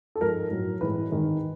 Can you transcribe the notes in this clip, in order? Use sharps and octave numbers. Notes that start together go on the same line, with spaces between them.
A4
G#2 F3 G#3 A#4
A2 F#3
A2 E3 G#3 B4
G#2 D#3 G#3